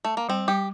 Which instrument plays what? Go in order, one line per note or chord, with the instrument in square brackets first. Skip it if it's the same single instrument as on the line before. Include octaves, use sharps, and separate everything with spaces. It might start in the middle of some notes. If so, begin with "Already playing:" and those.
[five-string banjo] A3
A#3
[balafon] G3 [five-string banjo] C4
[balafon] G3 [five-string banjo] G4